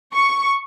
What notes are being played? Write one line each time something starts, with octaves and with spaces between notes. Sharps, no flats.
C#6